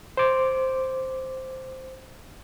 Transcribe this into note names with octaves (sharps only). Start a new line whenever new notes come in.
C5 D6